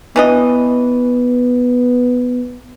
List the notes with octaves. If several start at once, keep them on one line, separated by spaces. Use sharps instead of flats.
E3 B3 D4 D#5